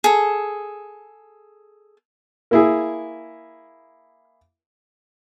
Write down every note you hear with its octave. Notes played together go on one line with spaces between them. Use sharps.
G#4 A4
A#3 E4 G#4